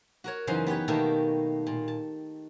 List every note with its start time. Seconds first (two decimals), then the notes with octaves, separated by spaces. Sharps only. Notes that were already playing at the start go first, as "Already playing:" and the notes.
0.24 F#4 A#4 C#5
0.47 F#2 C#3 E3 D#4 C5 C6
0.67 B3 G4 B4 C#5
0.88 B2 D#3 A3 A#3 G4 A4
1.67 A#2
1.88 A5